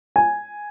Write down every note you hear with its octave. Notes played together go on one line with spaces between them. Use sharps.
G#5